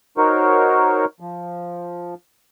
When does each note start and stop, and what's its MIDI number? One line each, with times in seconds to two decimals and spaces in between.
0.17 1.05 63
0.17 1.05 66
0.17 1.05 70
0.17 1.05 72
0.17 1.05 73
1.20 2.14 53